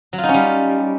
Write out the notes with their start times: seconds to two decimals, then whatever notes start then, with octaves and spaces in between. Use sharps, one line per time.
0.13 F#3
0.18 F4
0.23 D#4
0.29 C#4
0.34 G3